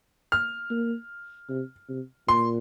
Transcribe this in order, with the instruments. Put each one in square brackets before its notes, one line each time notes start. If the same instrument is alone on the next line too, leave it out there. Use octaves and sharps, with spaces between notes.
[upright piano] F6
[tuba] A#3
C3
C3
[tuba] A#2 [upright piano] C6